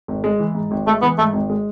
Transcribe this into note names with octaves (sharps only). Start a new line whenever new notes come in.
G#1
G#3
E3
G#2
G#1
G#3 A3
E3 B3
G#2 A3
G#1
G#3